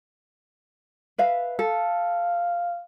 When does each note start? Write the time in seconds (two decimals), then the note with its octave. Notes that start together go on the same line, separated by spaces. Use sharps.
1.18 B4 E5 F5
1.59 A4 F5